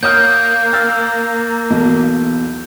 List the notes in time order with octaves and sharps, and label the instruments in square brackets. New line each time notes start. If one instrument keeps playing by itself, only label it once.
[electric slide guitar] A#3 [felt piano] C#5 D#6 F6 [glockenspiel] G6
[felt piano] E6 F6 A6
B1 E2